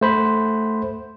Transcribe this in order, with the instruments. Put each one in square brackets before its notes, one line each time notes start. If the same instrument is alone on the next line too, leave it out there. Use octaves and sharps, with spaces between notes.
[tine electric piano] A3 C5 B5